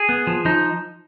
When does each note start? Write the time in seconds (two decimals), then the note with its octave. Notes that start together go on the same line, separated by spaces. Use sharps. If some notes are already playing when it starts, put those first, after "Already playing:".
Already playing: G#4
0.09 B3
0.27 F3
0.45 F3 D#4